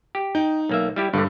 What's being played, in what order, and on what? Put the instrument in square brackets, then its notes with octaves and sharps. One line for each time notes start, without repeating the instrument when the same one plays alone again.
[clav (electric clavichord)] G4
[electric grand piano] D#4 [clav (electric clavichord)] G5
[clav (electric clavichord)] B1 A#3 E5
G3 E4 G4
[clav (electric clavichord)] G1 D3 [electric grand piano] G2